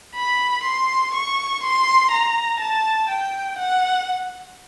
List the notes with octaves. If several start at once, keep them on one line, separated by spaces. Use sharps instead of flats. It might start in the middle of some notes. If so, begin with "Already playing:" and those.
B5
C6
C#6
C6
A#5
A5
G5
F#5